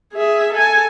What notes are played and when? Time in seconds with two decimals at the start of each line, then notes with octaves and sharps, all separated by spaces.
0.14 G#4 E5
0.53 A4 G#5